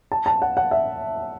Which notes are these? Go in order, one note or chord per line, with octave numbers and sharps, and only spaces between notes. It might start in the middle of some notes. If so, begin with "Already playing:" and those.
A5
A5
F#5
F#5
E5